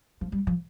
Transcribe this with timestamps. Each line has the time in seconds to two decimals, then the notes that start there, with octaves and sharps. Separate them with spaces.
0.21 F3
0.32 G3
0.47 F3